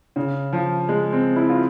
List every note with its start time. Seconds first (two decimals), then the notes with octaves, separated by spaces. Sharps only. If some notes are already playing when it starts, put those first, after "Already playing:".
0.16 C#3
0.53 F3
0.89 G#3
1.12 C4
1.36 E4
1.49 F4